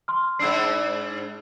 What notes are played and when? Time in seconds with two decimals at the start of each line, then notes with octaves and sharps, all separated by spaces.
0.08 C6 F6
0.39 G#2 D4 E6 C7